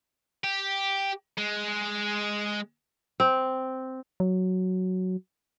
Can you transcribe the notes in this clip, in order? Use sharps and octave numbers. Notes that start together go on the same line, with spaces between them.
G4
G#3
C4
F#3